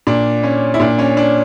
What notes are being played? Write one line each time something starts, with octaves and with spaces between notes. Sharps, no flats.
A#2 D4
C#4
E4
A#2 D4
C#4
D4